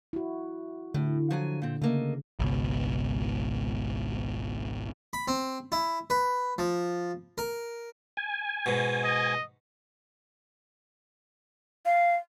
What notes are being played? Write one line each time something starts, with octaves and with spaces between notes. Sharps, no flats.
E4 F#4
A2 D3
F3 F#3 G#5
A#2 C4
C#3 A3 A#3 D#5
G#1 C#2 B2
B5
C4
E4
B4
F3
A#4
G#5
G#2 B2
D#5
F5